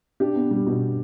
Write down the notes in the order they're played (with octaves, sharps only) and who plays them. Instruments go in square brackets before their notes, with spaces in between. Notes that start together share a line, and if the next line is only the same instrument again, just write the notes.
[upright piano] D4 G4
B3
G3
B2